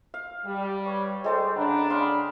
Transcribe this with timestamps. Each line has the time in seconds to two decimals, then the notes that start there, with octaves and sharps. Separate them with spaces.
0.14 F5
0.46 G3
0.86 B4 C#5
1.24 G#3 G4 A4 C5 D5
1.56 C#3 D4 F#5 A#5 B5
1.90 G4 D#5 F5 F#5 B5 C6